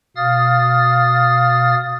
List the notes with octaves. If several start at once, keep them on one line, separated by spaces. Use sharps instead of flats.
B2 F5 D#6 F6 A6